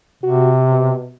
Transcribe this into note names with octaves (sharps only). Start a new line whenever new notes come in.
C3 F#4
B2